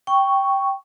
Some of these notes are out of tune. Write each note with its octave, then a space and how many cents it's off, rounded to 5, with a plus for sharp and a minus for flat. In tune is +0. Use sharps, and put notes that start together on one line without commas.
G5 +0 C#6 +0